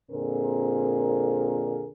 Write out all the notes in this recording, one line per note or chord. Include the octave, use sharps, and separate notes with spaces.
F2 A#2 D3 C4 G#4 A#4